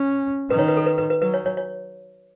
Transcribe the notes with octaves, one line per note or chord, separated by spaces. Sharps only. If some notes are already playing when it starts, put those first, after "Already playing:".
Already playing: C#4
D#3 B4
C#5
B4
A4
B4
B4
B4
F#3 B4
C#5
C#5
C#5